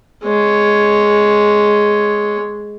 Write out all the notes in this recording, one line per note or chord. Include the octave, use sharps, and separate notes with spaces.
G#3 C#5